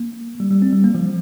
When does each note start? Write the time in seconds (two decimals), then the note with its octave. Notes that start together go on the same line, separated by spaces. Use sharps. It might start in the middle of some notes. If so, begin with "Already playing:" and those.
Already playing: A#3
0.40 G3
0.51 G3
0.62 C4
0.73 G3
0.84 A#3
0.95 F3